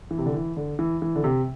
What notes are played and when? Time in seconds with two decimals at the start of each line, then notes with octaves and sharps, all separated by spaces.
0.11 E3
0.18 C3
0.26 D3
0.34 E3
0.57 D3
0.79 E3
1.02 E3
1.16 D3
1.24 C3